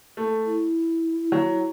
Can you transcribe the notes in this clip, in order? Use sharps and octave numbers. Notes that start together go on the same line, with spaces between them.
A3
E4
F#3